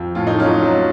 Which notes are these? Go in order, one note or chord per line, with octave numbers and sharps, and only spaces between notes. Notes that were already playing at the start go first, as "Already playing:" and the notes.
Already playing: F2
A2 F4
D#4
F#3 C#4 F4
F#3